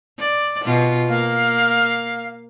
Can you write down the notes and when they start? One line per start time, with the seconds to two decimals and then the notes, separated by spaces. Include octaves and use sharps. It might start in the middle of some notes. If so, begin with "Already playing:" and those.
0.19 D5
0.64 B2 F4
1.09 A#3 F5